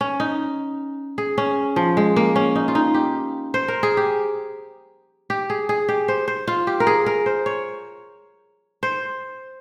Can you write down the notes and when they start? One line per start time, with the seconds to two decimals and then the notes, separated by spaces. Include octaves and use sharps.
0.01 C#4
0.20 D#4
1.18 G#4
1.38 C#4
1.76 F3
1.97 G#3
2.16 A#3
2.36 C#4
2.55 D#4
2.68 F4
2.75 D#4
2.94 G4
3.54 C5
3.68 A#4
3.83 G#4
3.97 G4
5.30 G4
5.50 G#4
5.69 G#4
5.89 G4
6.08 C5
6.28 C5
6.47 F4
6.67 G4
6.80 A#4
6.87 G#4
7.06 A#4
7.26 C5
7.46 C#5
8.83 C5